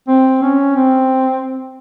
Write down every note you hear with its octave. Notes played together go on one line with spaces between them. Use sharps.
C4
C#4
C4